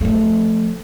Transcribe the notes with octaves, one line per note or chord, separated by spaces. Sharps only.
F3 A3